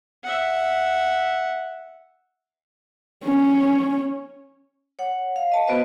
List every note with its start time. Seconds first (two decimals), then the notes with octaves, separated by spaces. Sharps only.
0.24 E5 F#5
3.24 C#4
4.99 C#5 F#5
5.36 F5
5.52 D#5 A5
5.67 B3 F#4 B4 C5 D#5